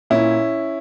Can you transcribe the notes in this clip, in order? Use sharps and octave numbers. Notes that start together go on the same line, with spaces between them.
A#2 C#4 E4